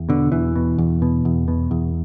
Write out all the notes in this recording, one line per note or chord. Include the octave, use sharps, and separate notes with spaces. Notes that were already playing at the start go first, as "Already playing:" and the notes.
Already playing: E2
B2 D3
E2 E3
B2
E2
B2
E2
B2
E2